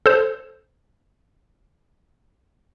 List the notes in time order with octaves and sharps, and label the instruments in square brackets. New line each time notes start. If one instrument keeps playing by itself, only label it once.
[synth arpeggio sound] A4 C5